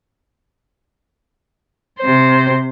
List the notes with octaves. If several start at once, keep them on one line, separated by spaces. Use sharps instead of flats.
C3 C5